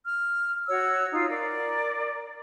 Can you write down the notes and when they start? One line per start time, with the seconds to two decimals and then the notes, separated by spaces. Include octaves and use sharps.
0.04 F6
0.68 F#4 C#5 E6
1.12 D#4 F4
1.28 A#4 D5